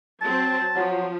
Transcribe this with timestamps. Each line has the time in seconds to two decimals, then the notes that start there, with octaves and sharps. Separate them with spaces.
0.21 F#3 C4 A5
0.76 F3 F#3